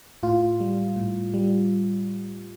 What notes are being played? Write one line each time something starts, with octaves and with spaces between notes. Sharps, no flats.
A2 F4
G3
A2
G3